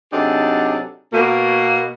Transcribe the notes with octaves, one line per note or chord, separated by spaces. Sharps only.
C3 F#3 D4 D#4 G#4 A4
B2 A#3